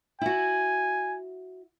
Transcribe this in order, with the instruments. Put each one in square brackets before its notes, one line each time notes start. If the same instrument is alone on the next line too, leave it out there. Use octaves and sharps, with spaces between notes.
[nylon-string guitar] E4 F#4 [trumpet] G#5